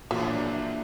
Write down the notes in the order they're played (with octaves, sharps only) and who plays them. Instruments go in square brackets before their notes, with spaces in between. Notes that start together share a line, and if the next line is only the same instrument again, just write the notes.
[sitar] E2 F3 E5 [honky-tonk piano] A#2 [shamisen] F#3 [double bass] A#3 D4